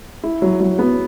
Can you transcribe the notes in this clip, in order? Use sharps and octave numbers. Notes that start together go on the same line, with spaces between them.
E4
F#3
F#3
B3